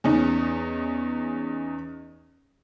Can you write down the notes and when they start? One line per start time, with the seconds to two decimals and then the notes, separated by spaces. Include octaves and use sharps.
0.04 E2 C#4 D#4